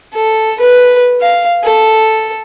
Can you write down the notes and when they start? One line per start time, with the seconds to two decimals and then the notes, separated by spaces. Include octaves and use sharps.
0.14 A4
0.60 B4
1.21 F5
1.64 A4